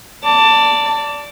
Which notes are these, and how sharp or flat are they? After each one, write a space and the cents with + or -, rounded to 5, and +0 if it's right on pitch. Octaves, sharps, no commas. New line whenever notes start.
D5 -15 A5 +20